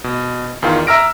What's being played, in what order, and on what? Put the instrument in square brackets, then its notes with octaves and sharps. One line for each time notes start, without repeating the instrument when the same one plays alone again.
[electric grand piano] B2
E2 D#3 F4
E5 A#5 E6 F6 A#6 D7